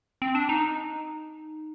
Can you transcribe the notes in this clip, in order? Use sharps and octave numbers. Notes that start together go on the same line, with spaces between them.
C4
D4
D#4